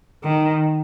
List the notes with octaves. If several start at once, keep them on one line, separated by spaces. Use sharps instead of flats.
D#3